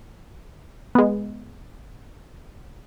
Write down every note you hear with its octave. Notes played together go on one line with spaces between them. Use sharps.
G#3 B3